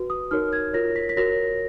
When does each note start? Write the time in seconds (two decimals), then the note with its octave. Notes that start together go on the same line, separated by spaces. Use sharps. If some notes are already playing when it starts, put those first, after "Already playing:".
Already playing: F#4 B4
0.10 D#6
0.31 D#4 F#4 A#4 C#5 F6
0.53 G#6
0.73 F4 A#4 C#5 A#6
0.96 B6
1.09 B6
1.17 F#4 A#4 C#5 A#6